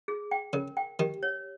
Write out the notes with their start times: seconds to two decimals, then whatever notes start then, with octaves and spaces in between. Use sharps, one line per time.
0.08 G#4
0.31 G5
0.53 C#3 A#4
0.77 G5
0.99 D#3 G4
1.23 C#5